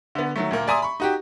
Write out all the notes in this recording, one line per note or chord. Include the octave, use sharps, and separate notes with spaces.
D3 B3
D#3 F#3 A3
D2 A#2 A#3
D5 E5 G#5 A#5 C6 D#6
B5 C#6
D#4 F#4 G4